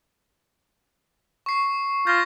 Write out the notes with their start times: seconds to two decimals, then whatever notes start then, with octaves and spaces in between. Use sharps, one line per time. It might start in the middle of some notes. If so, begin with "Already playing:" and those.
1.46 C#6 C7
2.07 F4 G6 A#6